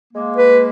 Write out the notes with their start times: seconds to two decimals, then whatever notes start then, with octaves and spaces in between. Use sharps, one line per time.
0.13 G#3 A#3
0.37 B4